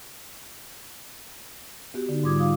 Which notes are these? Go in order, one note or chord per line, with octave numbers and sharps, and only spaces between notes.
B3 F#4 G4
D3 D#4
G#2 G3 F4 D6 D#6 G#6
F4 F5 D6 D#6